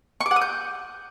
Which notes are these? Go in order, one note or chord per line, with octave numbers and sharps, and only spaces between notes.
C#6
D6
F#5
D#6
G6